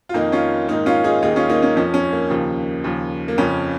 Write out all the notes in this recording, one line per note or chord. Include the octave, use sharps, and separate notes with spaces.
F4
F2 D#3 A#3 D#4
C#4 F4
G#2 D#3 A#3 D#4
C#4 F4
D#4 G#4
D#2 D#3 D#4 G#4
C#4 F4
A#3 D#4
C#4
F2 F3 C#4
C#4
A#3
D#2 C#3 F3
D#2 C#3 F3
A#3
F2 C#3 F3 C#4